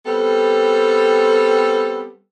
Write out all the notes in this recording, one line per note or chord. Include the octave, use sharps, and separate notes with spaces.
G3 B3 C4 A4